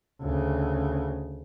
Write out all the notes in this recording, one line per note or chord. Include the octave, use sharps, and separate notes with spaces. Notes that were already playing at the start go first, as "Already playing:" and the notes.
D2 C#3